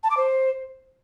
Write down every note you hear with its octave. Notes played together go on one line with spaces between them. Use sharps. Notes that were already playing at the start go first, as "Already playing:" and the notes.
A5
D6
C5